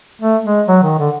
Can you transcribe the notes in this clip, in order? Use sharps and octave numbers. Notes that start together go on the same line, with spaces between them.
A3
G#3
F#3
D#3
D3